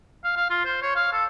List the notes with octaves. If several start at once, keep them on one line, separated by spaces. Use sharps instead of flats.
F5
F5
F4
C5
C#5
F5
A4